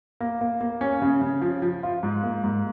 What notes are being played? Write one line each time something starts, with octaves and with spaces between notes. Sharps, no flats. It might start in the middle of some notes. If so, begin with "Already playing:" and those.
A#3
A#3
A#3
C#4
C#3
C#3
F3
F3
F4
G#2
A#3
G#2